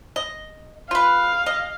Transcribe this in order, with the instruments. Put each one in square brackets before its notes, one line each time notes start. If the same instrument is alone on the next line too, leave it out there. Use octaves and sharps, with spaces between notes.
[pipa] D#5
[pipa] F4 B4 [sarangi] F5
[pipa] D#5